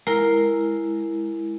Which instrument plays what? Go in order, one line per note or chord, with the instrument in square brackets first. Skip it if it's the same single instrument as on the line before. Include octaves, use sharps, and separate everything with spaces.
[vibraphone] G#3 E4 [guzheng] A#4